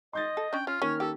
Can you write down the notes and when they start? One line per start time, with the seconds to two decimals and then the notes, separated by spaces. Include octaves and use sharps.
0.13 D#5 C6 G6 A6
0.37 A4
0.53 C#4 D4 G5
0.67 C#4 F4 F6
0.82 D#3 A#3 C#4 C#5
1.00 C#4 G4 A4